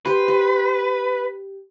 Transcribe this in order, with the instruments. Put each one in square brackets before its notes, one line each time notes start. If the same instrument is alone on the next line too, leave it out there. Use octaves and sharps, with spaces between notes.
[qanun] G4 C5 [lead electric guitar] B4
[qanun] G4